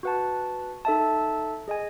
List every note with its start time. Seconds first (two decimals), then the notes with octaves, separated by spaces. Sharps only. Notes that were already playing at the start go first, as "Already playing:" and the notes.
0.03 F#4 B4 F#5 A5
0.85 D#4 A4 E5 A5
1.68 G#4 D#5 G#5